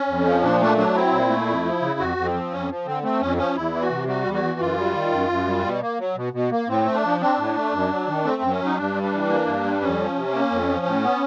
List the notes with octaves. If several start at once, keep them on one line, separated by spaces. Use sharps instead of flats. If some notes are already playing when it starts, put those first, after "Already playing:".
Already playing: C#4
F2
F3
A#2 D4
A3 D4
F#3 D4
C4 E4
A#2
A3
F2
F3
C#3
F2 F#4
F2
C4
F3
F2 C#4
F3
D3 C4
A3 C4
F2 C#4
F3 C#4
E2 E4
E3
F#4
C3
G3 F#4
E2
F#4
E3
F#2 F4
G3
D#3
F#2
F#2
G3
B2
A#3
F#3
B2
B2
A#3
A2 C4
A3
D4
F3
C4 D4
A2
A3
F#2
F#3
D#3
A3 C4
F#2
C#4
F#3
D#4
G2 D4
G3
D4
E3
A#3
G2
G3
F2 C#4
F3
C3
A#3
F2
F3
A2
B3